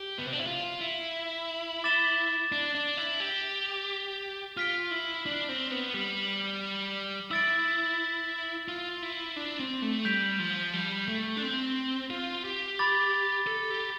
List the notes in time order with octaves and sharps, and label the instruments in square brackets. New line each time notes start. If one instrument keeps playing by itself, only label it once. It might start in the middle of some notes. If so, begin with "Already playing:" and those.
Already playing: [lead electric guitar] G4
B3
C4
D4
E4
F4
E4
[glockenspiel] D6 A6 E7 G7
[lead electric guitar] D4
D4
E4
G4
[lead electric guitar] F4 [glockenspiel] F6 B6 D7 G7
[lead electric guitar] E4
D4
C4
B3
G3
[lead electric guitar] E4 [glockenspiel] E6 A6 D7
[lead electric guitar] F4
E4
D4
C4
A3
[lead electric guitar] G3 [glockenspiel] G6 B6 D7 F7
[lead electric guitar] F3
G3
A3
D4
C4
F4
G4
[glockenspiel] B5 D6 A6
[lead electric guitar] A4
G4